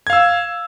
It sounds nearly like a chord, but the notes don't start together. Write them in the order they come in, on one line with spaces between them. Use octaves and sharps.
G#6 F5 E6